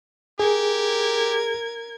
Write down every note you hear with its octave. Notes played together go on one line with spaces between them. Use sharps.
G4 G#4 A#4 G#6